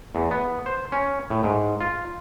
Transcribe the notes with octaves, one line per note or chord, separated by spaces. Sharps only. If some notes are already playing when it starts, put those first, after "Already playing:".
E2
B3
C5
C#4
A2
G#2
F4